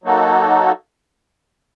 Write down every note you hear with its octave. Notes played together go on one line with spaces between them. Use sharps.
F#3 A#3 D#4 F#4 A4